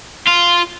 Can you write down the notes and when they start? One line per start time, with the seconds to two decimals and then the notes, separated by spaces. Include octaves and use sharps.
0.28 F4